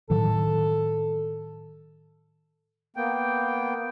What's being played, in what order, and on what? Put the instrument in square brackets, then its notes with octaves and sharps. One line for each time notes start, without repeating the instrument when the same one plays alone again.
[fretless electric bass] A2 D#3 F#3 [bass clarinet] A4
[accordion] A#3 B3 G5